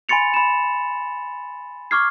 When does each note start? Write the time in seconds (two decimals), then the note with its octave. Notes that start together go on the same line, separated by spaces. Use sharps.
0.09 G#5 B5 C6 A6 C#7 F7
0.34 B5 E7
1.91 C#6 D6 F6 G#6 C7